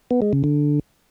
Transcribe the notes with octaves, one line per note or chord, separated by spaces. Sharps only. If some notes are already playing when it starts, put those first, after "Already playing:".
B3
G#3
C#3
D3